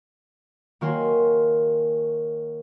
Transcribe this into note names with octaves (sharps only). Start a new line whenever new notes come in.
D#3 A#3 F#4 C#5 G#5 C6